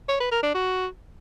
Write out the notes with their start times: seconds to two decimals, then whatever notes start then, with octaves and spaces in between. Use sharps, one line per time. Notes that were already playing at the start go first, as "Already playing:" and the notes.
0.08 C#5
0.20 B4
0.31 A#4
0.43 D4
0.54 F#4